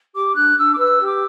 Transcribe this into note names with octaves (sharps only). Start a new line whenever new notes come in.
G4 D6
D4 F#6
D4 E6
D6
B4 E6
G4
D6